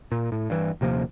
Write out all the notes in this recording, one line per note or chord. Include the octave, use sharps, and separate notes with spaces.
A#2
A2
G2 E3
D#1 C3 F3 A#3